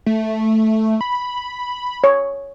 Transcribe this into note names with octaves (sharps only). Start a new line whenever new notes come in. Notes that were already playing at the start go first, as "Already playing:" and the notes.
A3
B5
C#5